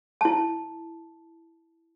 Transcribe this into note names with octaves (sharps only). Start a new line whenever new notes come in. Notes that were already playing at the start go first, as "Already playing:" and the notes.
E4 A5